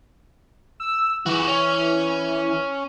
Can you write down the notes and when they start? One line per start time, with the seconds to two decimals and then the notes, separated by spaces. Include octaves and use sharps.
0.80 E6
1.26 E3 F#4 G4
1.47 C#4